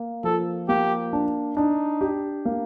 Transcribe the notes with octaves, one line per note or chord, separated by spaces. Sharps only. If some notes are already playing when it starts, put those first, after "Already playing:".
Already playing: A#3
F3 A4
A#3 G4
D4
D4 D#4
G4
A#3